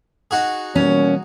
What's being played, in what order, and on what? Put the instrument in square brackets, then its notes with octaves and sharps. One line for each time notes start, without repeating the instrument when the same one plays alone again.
[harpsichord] D#4 F#4 G#4
[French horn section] B2 A#3 C#5 [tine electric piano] E3 G3 [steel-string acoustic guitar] C#4